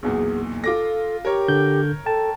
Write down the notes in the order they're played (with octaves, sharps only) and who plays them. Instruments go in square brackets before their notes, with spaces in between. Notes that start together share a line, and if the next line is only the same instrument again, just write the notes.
[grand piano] B1 E2 A#2 [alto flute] G#4
[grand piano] F4 D6 A#6 [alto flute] A4
[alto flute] G4 [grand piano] A#4 C#5
[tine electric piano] D3 G6
[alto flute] A4 [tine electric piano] G5 A5